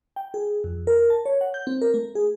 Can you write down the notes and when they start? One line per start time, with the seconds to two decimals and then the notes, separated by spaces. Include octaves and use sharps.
0.16 G5
0.34 G#4
0.64 F2
0.87 A#4
1.10 A5
1.26 C#5
1.41 F#5
1.54 G6
1.67 C4
1.82 A#4
1.94 A3
2.15 G#4